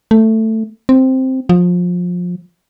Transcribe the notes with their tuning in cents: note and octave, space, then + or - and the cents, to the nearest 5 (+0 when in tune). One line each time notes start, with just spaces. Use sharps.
A3 +10
C4 +0
F3 +25